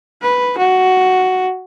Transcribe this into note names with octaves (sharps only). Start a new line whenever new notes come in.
B4
F#4